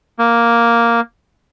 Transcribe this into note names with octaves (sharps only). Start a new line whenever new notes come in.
A#3